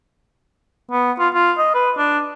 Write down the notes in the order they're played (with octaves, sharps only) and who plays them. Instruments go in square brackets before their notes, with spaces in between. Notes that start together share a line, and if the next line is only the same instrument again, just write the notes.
[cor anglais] B3
F4
F4
D#5
B4
D4